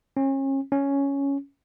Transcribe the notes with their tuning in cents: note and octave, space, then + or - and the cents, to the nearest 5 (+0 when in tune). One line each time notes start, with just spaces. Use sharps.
C#4 -35
C#4 +5